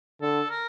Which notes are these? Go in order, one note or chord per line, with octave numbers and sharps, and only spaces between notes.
D3 A4
A#4